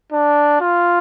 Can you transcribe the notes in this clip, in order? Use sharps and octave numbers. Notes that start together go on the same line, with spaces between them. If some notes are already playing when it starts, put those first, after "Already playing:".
D4
F4